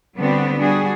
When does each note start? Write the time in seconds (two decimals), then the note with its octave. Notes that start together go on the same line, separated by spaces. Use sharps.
0.17 D3 G3 B3 C4 D4 F#4
0.58 G3 D4 F#4 G#4